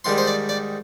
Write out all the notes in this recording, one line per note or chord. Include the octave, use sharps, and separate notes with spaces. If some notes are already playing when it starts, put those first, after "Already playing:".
G#2 D#3 G3 C6
C5
D5
D5